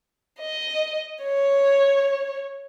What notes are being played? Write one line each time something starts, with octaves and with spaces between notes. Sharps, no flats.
D#5
C#5